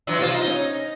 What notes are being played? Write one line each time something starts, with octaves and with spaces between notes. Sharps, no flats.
E3 F#3 D4
C2 F3 F4 C5
D#4
C#4